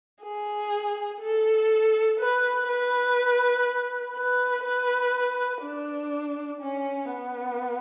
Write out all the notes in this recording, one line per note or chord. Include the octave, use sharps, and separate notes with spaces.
G#4
A4
B4
B4
B4
B4
D4
C#4
B3